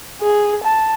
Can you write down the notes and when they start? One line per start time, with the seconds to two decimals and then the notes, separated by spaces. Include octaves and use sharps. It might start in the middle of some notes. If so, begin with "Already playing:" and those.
0.21 G#4
0.63 A5